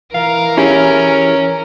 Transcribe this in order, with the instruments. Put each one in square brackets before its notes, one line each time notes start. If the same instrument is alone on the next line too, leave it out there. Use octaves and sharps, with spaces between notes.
[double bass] E3 [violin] A#4 [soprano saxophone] F5
[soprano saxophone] C#4 [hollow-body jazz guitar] E4 G4 G#4